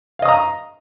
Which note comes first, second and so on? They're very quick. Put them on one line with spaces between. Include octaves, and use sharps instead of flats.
F5 D#5 D#6 A#5